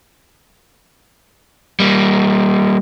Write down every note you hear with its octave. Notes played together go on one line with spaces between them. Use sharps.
G3 A#3